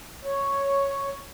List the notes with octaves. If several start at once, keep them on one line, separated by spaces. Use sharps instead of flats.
C#5